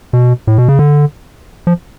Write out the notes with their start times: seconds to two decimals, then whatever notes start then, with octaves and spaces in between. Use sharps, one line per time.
0.13 B2
0.47 A2
0.58 B2
0.69 C#3
0.79 D3
1.67 F3